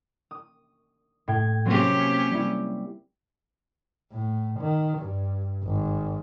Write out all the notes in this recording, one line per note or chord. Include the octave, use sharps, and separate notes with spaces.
D#6
A2 G5 G#6
C3 F#3 A#3 C4 C#4 G4
G3 E4
A2
D#3
G2
G#1